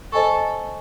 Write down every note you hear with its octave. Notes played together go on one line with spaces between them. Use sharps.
A4 C5 D#5 G#5 C#6